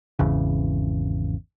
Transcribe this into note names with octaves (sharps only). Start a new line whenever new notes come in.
G#1 E2 C#3